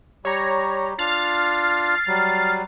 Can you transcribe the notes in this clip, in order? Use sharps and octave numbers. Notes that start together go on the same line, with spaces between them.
G3 G4 C#5 A#5
D4 F4 F6 A6 C7
F#3 G3